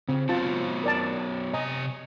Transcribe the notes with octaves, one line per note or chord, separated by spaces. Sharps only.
C#3 C4
F#3 B3 F4 C5 A5
A#4 D5 A5
C3 D#5 G#5 A#5